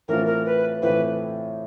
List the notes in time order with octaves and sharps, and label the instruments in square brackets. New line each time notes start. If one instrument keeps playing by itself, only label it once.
[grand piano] A2 E3 A3 C4 F4 [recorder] A#4
[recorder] A#4
B4
[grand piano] A2 E3 A3 C4 F4 [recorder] B4